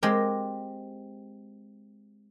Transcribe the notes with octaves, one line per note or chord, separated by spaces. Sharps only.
G#3 C4 G4 A#4